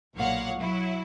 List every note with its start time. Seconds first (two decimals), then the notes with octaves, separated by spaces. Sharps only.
0.15 B1 A#2 C#5 F5 F#5
0.59 F#3 E4